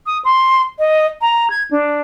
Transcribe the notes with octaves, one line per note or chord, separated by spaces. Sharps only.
D#6
C6
D#5
A#5
G#6
D4